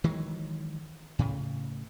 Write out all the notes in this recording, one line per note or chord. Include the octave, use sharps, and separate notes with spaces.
D#3 E3 F#3 G#3
A2 C#3